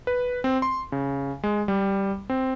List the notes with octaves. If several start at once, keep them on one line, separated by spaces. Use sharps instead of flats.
B4
C4
C6
C#3
G#3
G3
C4